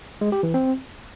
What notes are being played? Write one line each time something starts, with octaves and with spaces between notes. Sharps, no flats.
G#3
G4
E3
C4